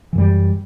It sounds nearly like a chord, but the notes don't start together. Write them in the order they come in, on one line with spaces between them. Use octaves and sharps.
E3 F#2 G3